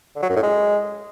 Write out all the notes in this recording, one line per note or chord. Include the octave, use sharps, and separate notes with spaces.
D3
F#3
F#2
A2
G#3